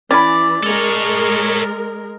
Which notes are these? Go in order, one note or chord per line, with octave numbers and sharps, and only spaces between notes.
E3 C#4 D5 F#5 B5
G#3 A4 A#4 C#5